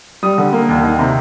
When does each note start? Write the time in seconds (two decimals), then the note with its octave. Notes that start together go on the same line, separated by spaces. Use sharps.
0.23 G3 D#6
0.38 D3
0.53 A#3
0.69 D#2
0.83 D#3
0.99 C3